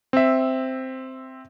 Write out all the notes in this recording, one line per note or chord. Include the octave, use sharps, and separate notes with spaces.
C4 E5